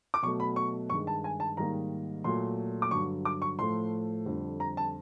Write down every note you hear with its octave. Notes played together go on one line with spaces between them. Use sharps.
D6
B2 F#3 A3 C#6
B5
C#6
G2 D#3 G#3 C#6
A5
G#5
A5
G#2 D#3 G3 A#3 A#5
A#2 F#3 A3 C6
D6
G2 D3 F#3 C#6
D6
C#6
A2 F3 A3 C6
F2 D3 G3
A#5
A5